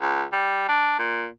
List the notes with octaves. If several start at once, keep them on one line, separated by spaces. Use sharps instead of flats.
C#2
G3
D4
A#2